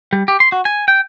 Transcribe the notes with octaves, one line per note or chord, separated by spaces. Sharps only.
G3
G4
C6
F#4
G#5
G5